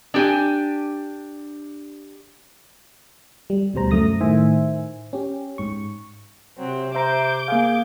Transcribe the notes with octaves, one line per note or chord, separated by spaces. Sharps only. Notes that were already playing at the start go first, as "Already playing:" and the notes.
D4 G4 G#5
G3
D2 B2 G3 C5 A#5
F#2 A3 D#6 A#6
A2 D#3 C5 E5 G#5
C#4 G4
G#2 C#6
C3 F#3 C4
C5 E5 A#5 D6 G6
A#3 G#4 F5